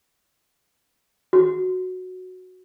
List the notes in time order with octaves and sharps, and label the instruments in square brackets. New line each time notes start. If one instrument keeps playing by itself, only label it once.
[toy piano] F#4